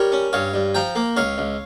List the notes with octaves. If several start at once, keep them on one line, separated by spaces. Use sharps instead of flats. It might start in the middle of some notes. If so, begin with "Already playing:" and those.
Already playing: G3 A#4 C#5
C#4
G2 C#5 F5
G2
F3 G5 A#5
A#3
C#2 C#5 F5
C#2